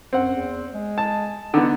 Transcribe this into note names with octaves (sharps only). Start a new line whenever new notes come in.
F#2 C4 F#5
E2
G#3
A5
D3 B3 D#4